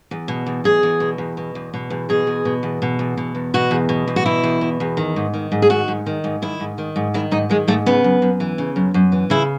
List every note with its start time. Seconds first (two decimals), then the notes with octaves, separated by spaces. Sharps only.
0.11 E2
0.28 B2
0.46 E2
0.64 B2 G#4
0.83 E2
1.00 B2
1.18 E2
1.37 B2
1.55 E2
1.74 B2
1.90 E2
2.09 B2 G#4
2.27 E2
2.45 B2
2.63 E2
2.82 B2
2.99 E2
3.17 B2
3.35 E2
3.54 B2 F#4
3.71 E2
3.89 B2
4.08 E2
4.16 F#4
4.25 B2 E4
4.44 E2
4.61 B2
4.80 E2
4.97 D#3
5.16 G#2
5.34 D#3
5.52 G#2
5.62 G#4
5.70 D#3 F#4
5.88 G#2
6.06 D#3
6.24 G#2
6.42 D#3 E4
6.60 G#2
6.78 D#3
6.96 G#2
7.14 D#3 E4
7.31 G#2 D#4
7.50 D#3 G#3
7.68 G#2 A3
7.86 C#3 B3
8.04 F#2
8.22 F#2
8.40 E3
8.58 C#3
8.76 F#2
8.94 F#2
9.12 E3
9.30 C#3 E4